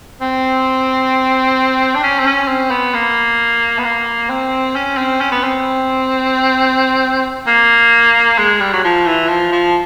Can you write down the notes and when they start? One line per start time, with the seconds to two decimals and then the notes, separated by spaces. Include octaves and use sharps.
0.21 C4
1.95 D4
2.03 C#4
2.19 C4
2.26 C#4
2.48 C4
2.71 B3
2.94 A#3
3.78 B3
3.84 A#3
4.29 C4
4.76 C#4
4.97 C4
5.21 C#4
5.32 B3
5.44 C4
7.47 A#3
8.38 G#3
8.60 G3
8.73 F#3
8.84 F3
9.06 E3
9.28 F3
9.52 F3